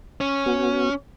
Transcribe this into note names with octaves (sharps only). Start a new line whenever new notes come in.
C#4
B3 F#4